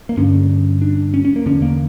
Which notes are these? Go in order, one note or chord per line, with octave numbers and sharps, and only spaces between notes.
A#3
G2 D3 C#4
D4
C#4
C#4
A#3
E2 D3 C#4
A#3